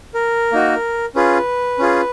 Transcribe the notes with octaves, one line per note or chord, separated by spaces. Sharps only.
A#4
A#3 D#4 F#4
C#4 F4 G#4 B4
C#4 F4 G#4